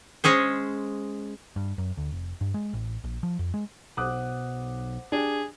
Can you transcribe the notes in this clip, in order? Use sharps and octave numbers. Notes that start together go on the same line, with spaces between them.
G#3 C#4 G#4 C5
G2
F#2
D2
F1
G2
G#3
A1
A#1
F3
F2
G#3
B1 C5 F#5 D6 D#6 F#6
D4 G4 G#4